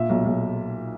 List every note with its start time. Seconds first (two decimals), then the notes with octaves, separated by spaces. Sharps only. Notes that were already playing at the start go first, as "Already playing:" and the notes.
Already playing: A#2 E5
0.09 B1
0.25 B1